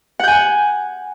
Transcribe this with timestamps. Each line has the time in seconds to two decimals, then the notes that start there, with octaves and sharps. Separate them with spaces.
0.20 F#5
0.24 G6
0.28 G#5